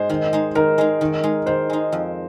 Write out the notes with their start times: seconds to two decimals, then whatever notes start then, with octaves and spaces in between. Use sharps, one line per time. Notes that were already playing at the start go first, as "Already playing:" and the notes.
Already playing: G#2 G#3 D#4 C5
0.09 D#3
0.33 G#3 D#4
0.55 D#3 A#4
0.78 G#3 D#4
1.01 D#3
1.23 G#3 D#4
1.46 D#3 C5
1.70 G#3 D#4
1.92 F2